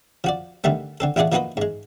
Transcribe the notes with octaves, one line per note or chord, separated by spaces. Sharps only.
F3 F#4 D5
D3 D#3 G3 A3 C4
D3 C4 A4
A1 E4 F4 G#4 D5 F#5
F3 A#3 D#4 F#4 B4 D#5
G#2 G#3